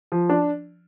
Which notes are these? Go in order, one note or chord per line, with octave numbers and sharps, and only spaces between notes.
F3
D4